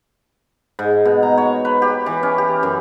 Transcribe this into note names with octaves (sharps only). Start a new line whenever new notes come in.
G#2
B2
A#5
C#5
B4
G4
E3
C#4
G4
F#2